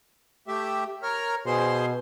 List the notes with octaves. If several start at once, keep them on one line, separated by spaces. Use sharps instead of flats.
A3 G4 E5
A#4 C#5 F6
B2 G#4 C5 C6